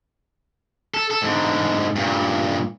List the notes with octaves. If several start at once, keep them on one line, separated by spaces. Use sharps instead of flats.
A4
A4
G#2 D3
G2 A#2